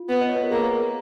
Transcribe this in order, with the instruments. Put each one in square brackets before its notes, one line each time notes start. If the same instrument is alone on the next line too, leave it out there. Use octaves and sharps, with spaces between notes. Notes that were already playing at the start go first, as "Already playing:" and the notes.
Already playing: [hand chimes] F4
[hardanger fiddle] B3
[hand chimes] D#5
C#5
B4
A#4
[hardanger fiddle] A#3 [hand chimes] G#4